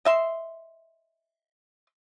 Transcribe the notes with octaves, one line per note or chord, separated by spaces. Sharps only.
D#5 E5 C6